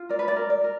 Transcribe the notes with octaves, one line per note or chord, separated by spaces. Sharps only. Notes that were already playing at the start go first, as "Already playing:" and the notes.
Already playing: F4
A#4 D5
B4
D5
A#4
D5
A#4